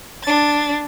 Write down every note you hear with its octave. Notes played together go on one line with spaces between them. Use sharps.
D4 A6